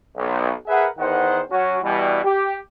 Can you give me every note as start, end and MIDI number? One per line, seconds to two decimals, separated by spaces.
0.16 0.52 35
0.68 0.88 68
0.68 0.88 70
0.68 0.88 71
0.68 0.88 76
0.68 0.88 78
0.99 1.41 40
0.99 1.41 51
0.99 1.41 72
0.99 1.41 78
1.51 1.78 54
1.51 1.78 61
1.51 1.78 66
1.82 2.21 47
1.82 2.21 52
1.82 2.21 55
2.24 2.56 67